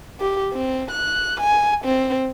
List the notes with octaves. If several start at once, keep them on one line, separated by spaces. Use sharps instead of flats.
G4
C4
F#6
G#5
C4